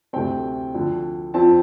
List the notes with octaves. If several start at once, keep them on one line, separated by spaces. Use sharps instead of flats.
D2 C3 A3 C4 G5
D2 D3 F3
F2 F3 C4 A5